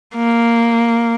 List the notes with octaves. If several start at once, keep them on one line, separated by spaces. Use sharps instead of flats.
A#3